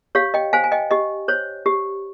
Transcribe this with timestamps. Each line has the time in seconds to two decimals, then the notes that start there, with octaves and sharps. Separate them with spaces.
0.15 G4 C#5 F5
0.34 D#5 G5
0.53 C5 F5 G#5
0.64 G#5
0.72 D#5 G5
0.91 G4 D#5
1.28 C5 C#5
1.66 G4